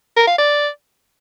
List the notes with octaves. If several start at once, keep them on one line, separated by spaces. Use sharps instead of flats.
A#4
F5
D5